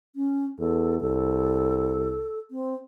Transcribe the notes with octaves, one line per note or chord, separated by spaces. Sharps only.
C#4
E2 A4
C2 A4
C4